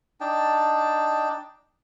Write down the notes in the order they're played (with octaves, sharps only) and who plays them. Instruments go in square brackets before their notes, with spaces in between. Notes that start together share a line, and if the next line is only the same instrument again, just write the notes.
[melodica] D4 D#4 G5 A5